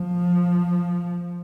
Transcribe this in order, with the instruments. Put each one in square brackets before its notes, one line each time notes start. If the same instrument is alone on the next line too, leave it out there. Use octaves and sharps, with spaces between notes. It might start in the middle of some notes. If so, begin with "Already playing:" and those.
Already playing: [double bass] F3